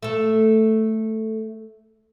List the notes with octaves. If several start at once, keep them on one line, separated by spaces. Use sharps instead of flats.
A3 A4